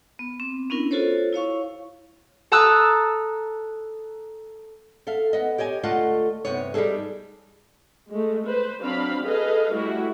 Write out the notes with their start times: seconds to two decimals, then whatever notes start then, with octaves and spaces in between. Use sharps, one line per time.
0.19 B3
0.40 C4
0.70 B3 C#4 D4 E4 A#4
0.91 F4 F#4 A4 C5 C#5
1.33 E4 C#5 F5 C#6
2.52 A4 A5 A#5 D#6 E6 F#6
5.07 A4 E5 F5
5.33 B3 D#5
5.58 G4 C#5 D#5 G#5
5.83 D2 A3 F4 D#5 F#5 A5
6.45 G2 C3 B3 C#5
6.74 G3 D4 D#4 G#4 A4
8.10 G#3 A3
8.46 B4 C5
8.82 F#3 C4 D4 F5 B5
9.25 G#4 A4 B4 D#5 F5
9.72 G3 A3 E4 F#4